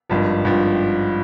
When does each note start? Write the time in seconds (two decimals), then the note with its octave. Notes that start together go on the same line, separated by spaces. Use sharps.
0.09 G#1 G2 F3
0.45 G#1 G2 F3